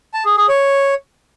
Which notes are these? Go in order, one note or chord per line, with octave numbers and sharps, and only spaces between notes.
A5
G#4
G#4
C#5